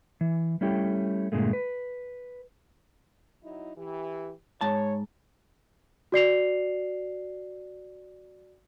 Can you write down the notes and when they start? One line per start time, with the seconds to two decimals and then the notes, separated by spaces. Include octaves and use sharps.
0.21 E3
0.61 G3 A3 C#4 E4 G4
1.32 G2 A#2 D3 G#3 A3
1.53 B4
3.43 F#3 D#4 E4
3.77 E3 G4
4.61 G#2 C#5 A5
6.12 F#4 D5 C7 F7